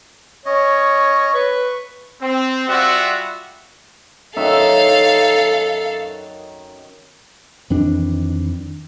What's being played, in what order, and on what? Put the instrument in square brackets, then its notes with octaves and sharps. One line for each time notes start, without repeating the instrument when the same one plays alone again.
[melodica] C#4 D#5 [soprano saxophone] C#5
[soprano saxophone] B4 [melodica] C#6
[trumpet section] C4
G3 F4 F#4 E5 F#5
[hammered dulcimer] F#2 D#3 E5 [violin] A4 F5
[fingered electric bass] F2 D#3 E3 D4